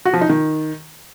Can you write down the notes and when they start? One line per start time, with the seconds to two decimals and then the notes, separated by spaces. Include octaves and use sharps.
0.05 F#4
0.13 F3
0.21 D#4
0.29 D#3